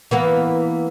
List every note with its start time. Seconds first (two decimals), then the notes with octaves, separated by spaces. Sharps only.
0.11 E3 A#3 B3